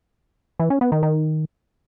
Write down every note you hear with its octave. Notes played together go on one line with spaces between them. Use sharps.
E3
C#4
B3
D#3
D#3